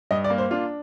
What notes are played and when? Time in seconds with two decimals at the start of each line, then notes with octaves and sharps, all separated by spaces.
0.11 G2 D#5
0.24 D5
0.30 A#3
0.38 C5
0.51 D4 F4